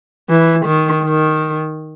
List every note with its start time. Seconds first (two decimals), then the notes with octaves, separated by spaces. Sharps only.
0.30 E3
0.66 D#3
1.03 D#3